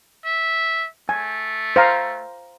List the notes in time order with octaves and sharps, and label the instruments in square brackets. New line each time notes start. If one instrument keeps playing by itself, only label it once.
[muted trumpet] E5
[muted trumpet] A3 [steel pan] G#5
[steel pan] C5 F5 A#5